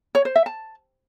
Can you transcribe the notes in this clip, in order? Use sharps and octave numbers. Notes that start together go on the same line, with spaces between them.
C#5
C5
E5
A5